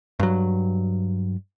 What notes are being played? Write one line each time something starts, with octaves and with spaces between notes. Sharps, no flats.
G2 F#3